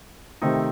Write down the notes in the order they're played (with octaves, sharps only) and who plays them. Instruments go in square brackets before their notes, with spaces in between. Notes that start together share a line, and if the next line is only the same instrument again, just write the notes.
[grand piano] C3 D#3 A3 C4 D#4